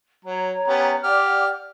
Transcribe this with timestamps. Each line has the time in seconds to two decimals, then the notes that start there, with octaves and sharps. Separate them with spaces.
0.25 F#3 C#5 A#5
0.68 B3 C#4 G4
1.04 G4 D5 F#5 D6 F6